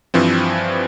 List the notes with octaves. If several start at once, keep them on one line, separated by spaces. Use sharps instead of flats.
G2 E3 F3 C4